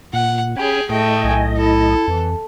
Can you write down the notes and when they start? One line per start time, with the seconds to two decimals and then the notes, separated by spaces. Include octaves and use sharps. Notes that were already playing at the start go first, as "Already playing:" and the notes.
0.13 A#2 F#5
0.57 C#4 G4 G#4 G#5 B5
0.89 A2 A3 D#5 G5
1.24 B1 G#5
1.57 E4 A4
2.08 F2 E3